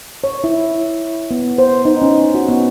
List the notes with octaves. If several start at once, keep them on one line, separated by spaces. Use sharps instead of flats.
C#5
E4
B3
C5
D#4
C#4
F#4
B3